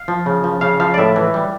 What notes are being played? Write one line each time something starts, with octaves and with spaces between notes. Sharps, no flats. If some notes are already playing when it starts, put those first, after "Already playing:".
Already playing: F5
F3
C#3
F3
C#3 F5
F3 F5
D5
A2 E5
E3
G3